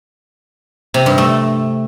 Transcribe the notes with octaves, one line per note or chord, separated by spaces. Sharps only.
C3
G2
A3